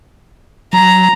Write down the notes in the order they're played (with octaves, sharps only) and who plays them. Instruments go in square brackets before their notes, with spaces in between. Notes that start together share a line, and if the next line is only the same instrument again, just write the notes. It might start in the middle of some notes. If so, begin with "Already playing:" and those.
[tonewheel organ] F#3 [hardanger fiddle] A#5